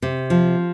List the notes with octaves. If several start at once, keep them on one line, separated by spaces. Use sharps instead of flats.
C3
F3